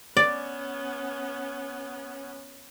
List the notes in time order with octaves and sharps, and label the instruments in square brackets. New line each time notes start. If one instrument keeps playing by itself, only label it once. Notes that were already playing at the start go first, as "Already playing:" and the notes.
[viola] B3 C#4 [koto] D5